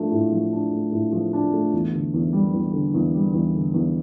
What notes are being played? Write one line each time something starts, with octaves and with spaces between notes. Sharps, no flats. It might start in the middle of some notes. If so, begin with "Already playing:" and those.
Already playing: F3 A3 D4
A2
F3
D4
A3
A2
F3
D4
A3
E2
D3
E2
G3
E2
D3
E2
G3
E2
D3
E2